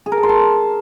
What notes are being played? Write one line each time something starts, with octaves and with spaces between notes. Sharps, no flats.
G#4
A#4
A5
C6
A5